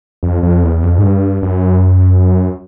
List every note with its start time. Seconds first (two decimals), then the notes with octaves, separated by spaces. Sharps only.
0.23 F2
0.43 F2
0.63 E2
0.83 F2
0.98 G#2
1.03 G2
1.42 F#2